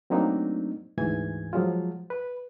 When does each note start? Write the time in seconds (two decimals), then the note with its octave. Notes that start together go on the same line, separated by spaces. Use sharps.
0.10 F#3 A3 A#3 C4 D4 D#4
0.98 D2 G#2 E3 G#5 G#6
1.53 F3 F#3 G#3 F4
2.10 B4